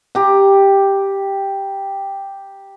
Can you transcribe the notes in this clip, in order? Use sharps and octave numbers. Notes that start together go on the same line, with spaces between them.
G4 A#5